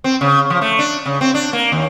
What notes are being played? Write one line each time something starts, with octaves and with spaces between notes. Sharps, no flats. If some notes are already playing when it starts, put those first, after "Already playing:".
C4
C#3
F3
A3
D4
C#3
C4
D4
A#3
D#2